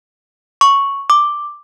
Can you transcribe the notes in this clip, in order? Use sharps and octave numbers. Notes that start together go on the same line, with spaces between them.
C#6
D6